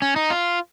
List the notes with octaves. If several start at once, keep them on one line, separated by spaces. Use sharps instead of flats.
C#4
D#4
F4